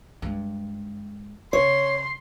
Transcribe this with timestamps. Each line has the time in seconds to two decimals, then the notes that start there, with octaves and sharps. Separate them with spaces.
0.22 G2 G#3
1.53 C#3 C#5 C6